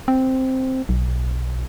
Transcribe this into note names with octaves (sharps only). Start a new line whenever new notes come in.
C4
B1